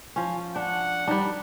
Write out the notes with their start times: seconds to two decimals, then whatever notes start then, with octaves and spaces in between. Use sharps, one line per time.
0.16 F3 C#4
0.56 D4 F#5
1.07 D#3 G3 D4